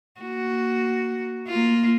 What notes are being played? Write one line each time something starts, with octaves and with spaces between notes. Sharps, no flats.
A#3 F#4
A#3 F4